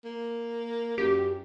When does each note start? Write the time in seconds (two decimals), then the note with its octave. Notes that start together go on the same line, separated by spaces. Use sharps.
0.05 A#3
0.98 F#2 G4